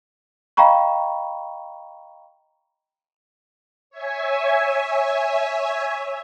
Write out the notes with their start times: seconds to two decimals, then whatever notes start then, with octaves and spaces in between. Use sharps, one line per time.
0.57 D#5 F5 G5 A#5 B5 C#6
3.90 C#5 E5 G#5